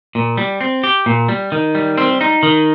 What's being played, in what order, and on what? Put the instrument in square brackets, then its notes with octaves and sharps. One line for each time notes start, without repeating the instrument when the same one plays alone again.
[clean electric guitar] A#2
G3
C4
G4
A#2
G3
D#3
G3
C4
D#4
D#3